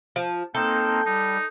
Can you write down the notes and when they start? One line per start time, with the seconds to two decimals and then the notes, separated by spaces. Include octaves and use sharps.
0.16 F3
0.55 A#3 C4 D#4 A4 G5
1.06 G3 D#4